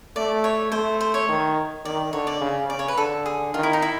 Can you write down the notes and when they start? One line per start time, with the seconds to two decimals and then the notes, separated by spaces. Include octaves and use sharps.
0.16 A3 D5
0.44 C#5
0.72 A3 C5
1.01 C5
1.14 C#5
1.28 D#3
1.85 D#3 D5
2.13 D3 C#5
2.27 D5
2.41 C#3
2.69 C#3 D5
2.79 C#5
2.88 B4
2.97 D3 A4
3.26 G#4
3.54 D#3 F4
3.63 E4
3.73 D#4
3.82 E4